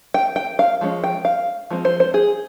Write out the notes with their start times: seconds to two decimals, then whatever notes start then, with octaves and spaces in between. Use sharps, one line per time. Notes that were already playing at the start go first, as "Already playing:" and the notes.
0.14 G5
0.36 G5
0.59 F5
0.81 F3 G#3 C#4
1.04 G5
1.25 F5
1.71 F3 G#3 C4
1.85 C5
2.00 C5
2.14 G#4